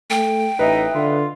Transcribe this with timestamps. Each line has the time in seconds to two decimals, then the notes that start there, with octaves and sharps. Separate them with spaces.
0.10 A3 G5
0.59 A1 D#4 B4 D#5 E5
0.94 D3 F4